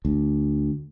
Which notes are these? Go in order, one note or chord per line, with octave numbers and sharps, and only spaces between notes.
D2